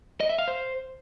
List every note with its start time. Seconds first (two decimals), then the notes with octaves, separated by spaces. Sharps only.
0.20 D#5
0.29 E5
0.39 F5
0.48 C5